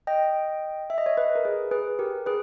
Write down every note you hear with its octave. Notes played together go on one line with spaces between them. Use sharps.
D#5 G5
E5
D#5
C#5 E5
B4 D#5
A#4
G#4 B4
G#4 B4
G4 A#4
G#4 B4